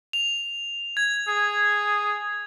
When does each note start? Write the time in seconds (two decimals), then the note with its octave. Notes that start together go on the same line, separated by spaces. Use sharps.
0.13 F7
0.97 G#6
1.28 G#4